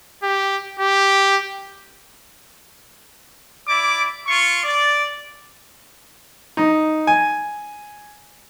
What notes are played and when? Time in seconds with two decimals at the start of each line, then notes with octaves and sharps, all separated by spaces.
0.23 G4
0.79 G4
3.69 E4 D5 D6
4.28 F4 C#6
4.64 D5
6.57 D#4
7.07 G#5